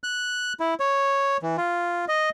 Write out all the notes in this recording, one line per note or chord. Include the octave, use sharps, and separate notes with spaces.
F#6
E4
C#5
E3
F4
D#5